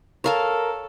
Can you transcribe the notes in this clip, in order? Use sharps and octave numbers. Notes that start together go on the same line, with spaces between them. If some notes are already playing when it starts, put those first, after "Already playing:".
A4 A#4 C#5 F5 A5